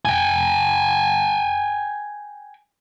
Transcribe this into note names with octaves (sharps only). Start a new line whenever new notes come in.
G5 G#5